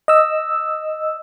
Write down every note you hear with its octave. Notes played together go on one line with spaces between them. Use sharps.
D#5 E6